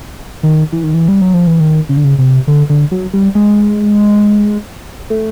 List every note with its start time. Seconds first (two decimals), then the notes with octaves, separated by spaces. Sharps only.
0.43 D#3
0.72 E3
0.83 D#3
0.94 E3
1.08 G3
1.22 F#3
1.34 F3
1.47 E3
1.60 D#3
1.89 C#3
1.97 D3
2.04 C#3
2.18 C3
2.48 D3
2.70 D3
2.91 F#3
3.13 G3
3.35 G#3
5.10 A3